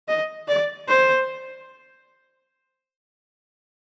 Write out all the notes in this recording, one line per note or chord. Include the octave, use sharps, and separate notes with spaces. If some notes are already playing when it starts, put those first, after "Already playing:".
D#5
D5
C5